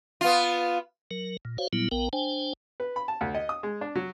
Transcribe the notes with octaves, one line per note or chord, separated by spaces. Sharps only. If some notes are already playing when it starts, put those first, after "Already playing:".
B3 F4
F#3 A#4
A#2
F#4 C5 C#5 F5
A#2 F#3 G3 B3 E4
A#1 B3 A#4 G5
D4 C5 G5 G#5
B4
B5
A5
D2
D#5
D#6
G#3
D4
F#3